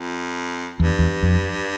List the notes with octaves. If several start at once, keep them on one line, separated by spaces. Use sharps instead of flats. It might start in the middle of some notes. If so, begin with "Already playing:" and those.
Already playing: F2
E2 G2
E2
F2